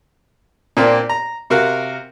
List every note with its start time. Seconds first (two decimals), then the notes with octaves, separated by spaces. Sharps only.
0.77 A#2 A#3 C4 D4
1.09 A#5
1.50 C3 F#4 A#4 F5 F#5